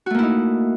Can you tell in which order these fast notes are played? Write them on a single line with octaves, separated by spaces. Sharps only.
F#4 A3 A#3 E4 D#4